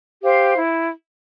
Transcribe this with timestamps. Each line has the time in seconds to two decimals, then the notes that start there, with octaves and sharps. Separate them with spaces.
0.23 G4 C5 F5
0.56 E4